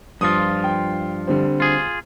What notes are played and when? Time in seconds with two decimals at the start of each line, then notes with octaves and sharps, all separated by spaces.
0.21 G2 F3 F4 D#6
0.64 G5
1.27 D3 G3 C4
1.60 F4 G#4